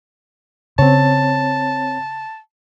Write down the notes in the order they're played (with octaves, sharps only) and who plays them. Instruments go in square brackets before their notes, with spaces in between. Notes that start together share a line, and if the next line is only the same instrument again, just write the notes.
[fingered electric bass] C#3 [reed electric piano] C4 C#5 [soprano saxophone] A5